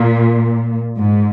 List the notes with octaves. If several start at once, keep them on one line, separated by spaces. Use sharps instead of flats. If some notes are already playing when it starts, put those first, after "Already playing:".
Already playing: A#2
G#2